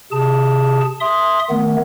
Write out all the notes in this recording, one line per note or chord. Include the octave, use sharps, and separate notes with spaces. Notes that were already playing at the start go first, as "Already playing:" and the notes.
C3 G#4 A5
E5 C6 D#6
D#3 A3 B3